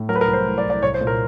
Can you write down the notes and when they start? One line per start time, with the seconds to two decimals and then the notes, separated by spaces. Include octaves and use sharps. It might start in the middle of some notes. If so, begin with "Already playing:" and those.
Already playing: A2
0.09 F#3 A#4
0.15 B4
0.21 A#4
0.27 C2
0.33 C5
0.45 A3
0.58 D5
0.64 C2
0.70 D5
0.83 C2 C#5
0.94 C5
1.01 A#2
1.07 A#4